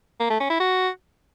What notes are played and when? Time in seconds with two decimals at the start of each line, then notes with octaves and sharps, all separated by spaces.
0.20 A#3
0.30 A3
0.40 C#4
0.50 E4
0.60 F#4